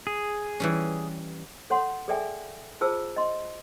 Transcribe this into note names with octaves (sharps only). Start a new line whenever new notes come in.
G#4
E3 G3 C#4
A4 C#5 F#5 C6
G#4 A4 D5 E5 G5 G#5
F4 G#4 C5 A5 E6
D#5 C6